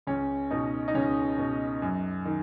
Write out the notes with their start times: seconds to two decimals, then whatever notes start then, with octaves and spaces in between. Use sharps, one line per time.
0.07 C#2 C#4
0.51 B2 D#4
0.88 D#4
0.94 C#2 C#4
1.38 B2
1.82 F#2
2.25 D#3